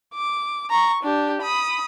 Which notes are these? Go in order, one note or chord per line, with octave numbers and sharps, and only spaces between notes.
D6
A#5 C#6
D4 G4
B5 D#6